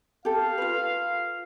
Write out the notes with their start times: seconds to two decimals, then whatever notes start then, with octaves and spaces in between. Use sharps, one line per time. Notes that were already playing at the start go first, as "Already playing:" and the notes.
0.25 G4 A4 F5
0.58 F4 B4